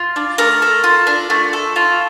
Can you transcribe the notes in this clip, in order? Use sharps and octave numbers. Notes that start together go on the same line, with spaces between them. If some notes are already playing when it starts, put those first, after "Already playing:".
Already playing: F4
D4
A3 A#4
A4
F4
D4
A3
A4
F4